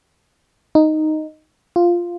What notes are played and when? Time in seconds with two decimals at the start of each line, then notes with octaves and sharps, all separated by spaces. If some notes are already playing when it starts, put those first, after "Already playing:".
0.75 D#4
1.76 F4